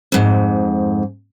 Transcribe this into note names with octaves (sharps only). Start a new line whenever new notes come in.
F2 G#2